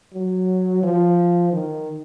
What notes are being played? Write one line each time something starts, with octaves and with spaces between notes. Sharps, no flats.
F#3
F3
D#3